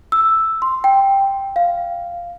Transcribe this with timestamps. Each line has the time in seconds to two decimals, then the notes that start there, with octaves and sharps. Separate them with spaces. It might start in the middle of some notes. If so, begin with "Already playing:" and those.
0.12 E6
0.62 C6
0.84 G5
1.56 F5